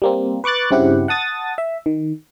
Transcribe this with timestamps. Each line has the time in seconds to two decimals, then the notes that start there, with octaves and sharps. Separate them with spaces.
0.02 G3 A#3 C4
0.44 B4 C#6 D6 F#6 A6
0.71 G2 C#3 C4 E4 G4 F#5
1.08 F#5 A5 D#6 A6
1.58 E5
1.86 D#3